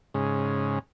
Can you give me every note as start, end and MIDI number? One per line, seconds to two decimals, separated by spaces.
0.14 0.79 44
0.14 0.79 49